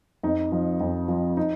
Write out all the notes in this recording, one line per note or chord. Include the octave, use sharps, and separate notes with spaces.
F2 D#4
F3
F2
F3
D#4